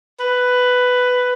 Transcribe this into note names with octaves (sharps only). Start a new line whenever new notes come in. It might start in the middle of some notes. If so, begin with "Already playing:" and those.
B4